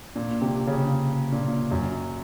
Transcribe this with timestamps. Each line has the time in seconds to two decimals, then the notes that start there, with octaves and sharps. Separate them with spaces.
0.16 A#2
0.42 C3
0.67 C#3
1.32 A#2
1.71 F#2